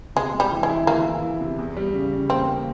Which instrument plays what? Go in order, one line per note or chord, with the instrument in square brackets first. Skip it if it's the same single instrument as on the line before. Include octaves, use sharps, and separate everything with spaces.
[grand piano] C3 [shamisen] G#3
[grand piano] G#3
[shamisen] G3
[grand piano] E3
[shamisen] G#3
[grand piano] E4
[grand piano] E3 [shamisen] A#3
[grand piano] E3
E4
C3
E2
G3
C#3
C#3
[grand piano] A#3 [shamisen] C4
[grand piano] A#3